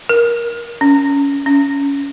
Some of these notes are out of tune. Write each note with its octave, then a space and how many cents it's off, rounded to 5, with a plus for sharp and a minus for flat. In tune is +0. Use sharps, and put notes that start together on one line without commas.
A#4 +15
C#4 +20
C#4 +20